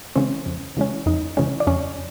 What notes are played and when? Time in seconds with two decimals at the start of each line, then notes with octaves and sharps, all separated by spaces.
0.16 C#3 E3 G#3 C4 C#4 C5
0.46 F2
0.77 C#3 E3 G#3 C#4
1.06 F2 D#4 D#5
1.37 C#3 E3 G#3 C#4
1.60 D5
1.67 F2 C#4 C#5